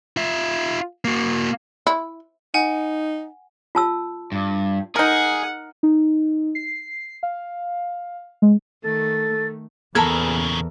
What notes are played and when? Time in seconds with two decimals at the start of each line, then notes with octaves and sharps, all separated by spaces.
0.17 F4 E5
1.05 A#3 F#4
1.87 E4
2.54 D#4 F#5 G#5
3.75 F4 A5 E6
4.32 G2
4.96 D#4 G#4 A#4 F#5
5.83 D#4
6.55 C7
7.23 F5
8.42 G#3
8.84 D#3 A3 A4 A6
9.95 E2 A#2 C#3 A4 A#4 A5 B5 G#6